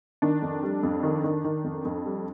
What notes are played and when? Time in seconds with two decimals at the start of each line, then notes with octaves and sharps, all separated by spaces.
0.22 D#3 D4
0.42 F2
0.63 G3
0.83 F2
1.03 D#3
1.24 D#3
1.44 D#3
1.64 F2
1.85 F2
2.05 G3